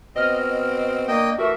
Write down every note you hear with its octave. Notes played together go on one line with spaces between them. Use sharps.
B2 C4 D#5 F6
A#3 D4 D#5 G5
E3 A3 F#4 A#4 E5